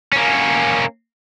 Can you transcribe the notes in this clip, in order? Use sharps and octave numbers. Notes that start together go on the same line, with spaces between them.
A#3 C#4